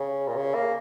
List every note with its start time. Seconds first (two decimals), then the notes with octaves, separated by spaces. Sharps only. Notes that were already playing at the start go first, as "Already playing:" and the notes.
Already playing: C#3
0.28 A#2
0.36 C#3
0.55 A#3